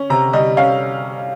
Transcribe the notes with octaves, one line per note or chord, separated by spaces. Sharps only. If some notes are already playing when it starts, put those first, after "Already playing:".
Already playing: C#4
C3 A#5
G3 D#5
C#4 F5